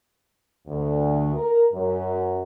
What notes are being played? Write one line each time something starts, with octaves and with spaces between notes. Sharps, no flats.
D2
A#4
F#2